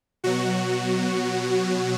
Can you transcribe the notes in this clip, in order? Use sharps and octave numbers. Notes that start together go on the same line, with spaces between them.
B2 F#3 F#4